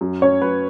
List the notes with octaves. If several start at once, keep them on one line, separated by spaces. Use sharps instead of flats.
F#2
C#4 C#5
F#2 B4